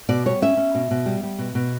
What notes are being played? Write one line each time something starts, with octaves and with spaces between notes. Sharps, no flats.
B2 D5
G3 C#5
C#4 E5
C#4
B2
B2
G3
G3
B2
B2